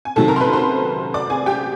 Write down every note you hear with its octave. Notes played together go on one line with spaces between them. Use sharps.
G#5
C3 D#3 F#3 A4 A5
A#4 A#5
C6
B4 B5
C5 C6
D5 D6
G#4 G#5
G4 G5